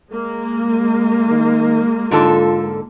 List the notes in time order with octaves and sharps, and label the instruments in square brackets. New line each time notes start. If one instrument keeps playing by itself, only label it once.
[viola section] G#3 A#3
[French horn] D#3
[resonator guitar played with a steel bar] G#2 D3 A4 [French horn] F4